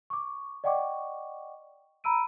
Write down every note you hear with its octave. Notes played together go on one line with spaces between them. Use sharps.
C#6 D6
D5 D#5 F#5 G5 C#6 D6
A#5 B5 E6 D7 D#7